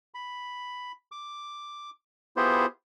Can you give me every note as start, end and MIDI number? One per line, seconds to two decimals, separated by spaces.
0.14 0.92 83
1.12 1.90 86
2.37 2.66 59
2.37 2.66 64
2.37 2.66 65
2.37 2.66 67
2.37 2.66 68
2.37 2.66 72